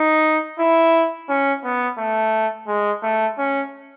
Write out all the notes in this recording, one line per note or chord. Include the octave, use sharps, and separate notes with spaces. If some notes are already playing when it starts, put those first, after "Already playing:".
Already playing: D#4
E4
C#4
B3
A3
G#3
A3
C#4